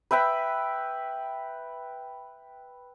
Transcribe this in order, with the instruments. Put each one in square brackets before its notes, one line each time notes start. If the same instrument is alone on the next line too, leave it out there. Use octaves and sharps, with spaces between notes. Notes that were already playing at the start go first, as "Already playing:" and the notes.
[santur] B4 E5 G5 B5